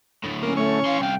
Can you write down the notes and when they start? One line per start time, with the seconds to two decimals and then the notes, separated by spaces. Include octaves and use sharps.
0.24 D2 A2
0.43 A#3 C#4
0.57 A3 C#5
0.86 E3 F5 C6
1.01 C2 F5 G5